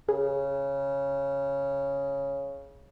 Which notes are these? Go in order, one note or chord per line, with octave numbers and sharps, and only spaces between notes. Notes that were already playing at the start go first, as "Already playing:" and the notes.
C#3 G#4